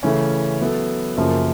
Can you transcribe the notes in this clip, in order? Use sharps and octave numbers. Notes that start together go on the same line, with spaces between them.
C#3 E3 A3 C#4
F#3 B3 E4 A4
F#2 C#3 F3 A#3